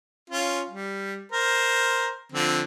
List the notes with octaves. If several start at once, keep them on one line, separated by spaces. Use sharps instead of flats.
C#4 F4
G3
A#4 C5
D3 F3 C4